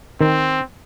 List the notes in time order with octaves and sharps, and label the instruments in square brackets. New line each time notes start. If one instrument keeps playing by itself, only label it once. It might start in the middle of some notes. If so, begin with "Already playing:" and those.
[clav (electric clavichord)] D#3 [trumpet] C4